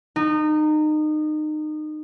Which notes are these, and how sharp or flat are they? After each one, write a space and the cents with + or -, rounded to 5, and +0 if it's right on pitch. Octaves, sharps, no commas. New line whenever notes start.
D#4 -25